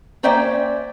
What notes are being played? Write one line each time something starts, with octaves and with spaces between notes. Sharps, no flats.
A#3 C#4 C5 D5 E5 G5